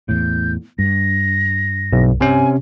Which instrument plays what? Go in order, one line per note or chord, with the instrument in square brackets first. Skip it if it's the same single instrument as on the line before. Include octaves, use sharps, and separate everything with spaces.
[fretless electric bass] E2 A2 [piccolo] G6
[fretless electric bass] G2 [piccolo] A#6
[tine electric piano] B1
[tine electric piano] C3 C#4 [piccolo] G#5